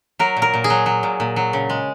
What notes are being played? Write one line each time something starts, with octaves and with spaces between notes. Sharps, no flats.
F#3 A#4
A#2
A#4
A#2
G#4
F#3
F#3
A#2
A#2
F#3
C#3
G#3